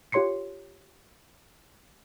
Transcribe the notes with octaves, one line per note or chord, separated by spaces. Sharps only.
F4 G4 C#5 C6 C7 C#7